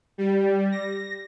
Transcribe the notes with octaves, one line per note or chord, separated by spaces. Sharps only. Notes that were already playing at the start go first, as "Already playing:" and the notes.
G3
A#6